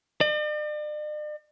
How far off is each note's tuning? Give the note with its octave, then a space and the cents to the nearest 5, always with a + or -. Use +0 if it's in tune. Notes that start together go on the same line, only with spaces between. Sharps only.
D5 +45